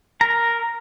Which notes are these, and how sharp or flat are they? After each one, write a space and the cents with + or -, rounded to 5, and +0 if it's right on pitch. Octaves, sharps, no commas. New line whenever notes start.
A#4 +0 A#5 +0